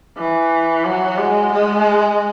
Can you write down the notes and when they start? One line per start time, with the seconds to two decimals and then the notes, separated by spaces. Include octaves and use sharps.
0.17 E3
0.85 F#3
1.18 G#3
1.53 G#3